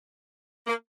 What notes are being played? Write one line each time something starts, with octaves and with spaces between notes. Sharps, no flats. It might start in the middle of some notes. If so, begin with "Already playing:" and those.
A#3